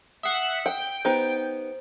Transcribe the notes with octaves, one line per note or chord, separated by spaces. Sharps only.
E5 F#5 D#6 C7
F#5 G5
B3 D#4 G4 C5